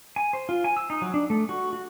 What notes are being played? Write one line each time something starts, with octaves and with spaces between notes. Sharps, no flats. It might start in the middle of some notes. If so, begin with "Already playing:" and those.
G#5
C5
F4
G#5
E6
D#4
F#3
D4
A3
F#4
F#4